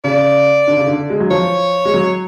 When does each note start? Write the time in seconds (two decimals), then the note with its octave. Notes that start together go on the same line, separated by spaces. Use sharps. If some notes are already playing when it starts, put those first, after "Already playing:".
0.04 C#3 D5
0.67 D3
0.77 C#3
0.88 D3
1.10 G#3
1.20 F#3
1.31 F3 C#5
1.85 G#3
1.94 F#3